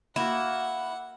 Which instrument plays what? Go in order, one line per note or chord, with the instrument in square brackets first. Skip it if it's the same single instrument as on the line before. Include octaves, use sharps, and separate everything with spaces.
[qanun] A#3 F#4 [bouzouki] E4 [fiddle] F#5